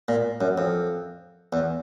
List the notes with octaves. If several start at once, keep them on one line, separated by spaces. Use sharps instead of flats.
A#2
F#2
F2
E2